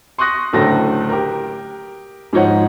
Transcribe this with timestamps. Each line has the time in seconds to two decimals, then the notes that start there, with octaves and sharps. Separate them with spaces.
0.18 C6 C#6 D#6 F#6 A#6
0.53 F#1 A2 D3 F#3 A4 A#6
1.10 G4 A#4
2.33 G#2 F3 D#4 C#5 F#5